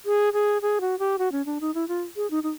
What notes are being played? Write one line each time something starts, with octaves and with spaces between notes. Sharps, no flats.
G#4
G#4
G#4
F#4
G4
F#4
C#4
D4
D#4
E4
F4
G#4
D#4
D#4